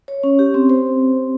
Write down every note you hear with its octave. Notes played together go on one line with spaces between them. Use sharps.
C#5
C#4
G4
C4
C5